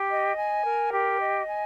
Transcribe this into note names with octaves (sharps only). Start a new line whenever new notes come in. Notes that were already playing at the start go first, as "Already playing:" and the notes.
Already playing: G4
D#5
G#5
A#4
G4
D#5
G#5